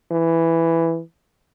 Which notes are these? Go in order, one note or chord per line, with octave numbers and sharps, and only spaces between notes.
E3